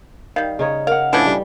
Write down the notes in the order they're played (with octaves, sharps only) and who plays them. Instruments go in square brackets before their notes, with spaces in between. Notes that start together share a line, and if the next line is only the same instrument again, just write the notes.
[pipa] D#3 G3 [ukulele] F5
[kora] C#3 D#4 C#5
[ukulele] A#4 F#5 [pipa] F5
[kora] A2 [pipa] E3 F3 C#4 [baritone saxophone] D4
[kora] G3